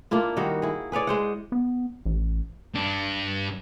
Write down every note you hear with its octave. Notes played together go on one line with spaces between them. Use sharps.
A#3 D4 E4 F4
D#3 G3 D#4 F#4
E4 G#4
G#4 B4 C#5 D5
G#3 C5 F#5
B3
A1
G2 D4